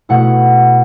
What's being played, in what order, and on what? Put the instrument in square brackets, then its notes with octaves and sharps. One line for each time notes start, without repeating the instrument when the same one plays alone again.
[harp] B2 A3 E4 F#5